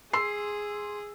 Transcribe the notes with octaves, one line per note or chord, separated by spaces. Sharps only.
G#4 C6 E6 C7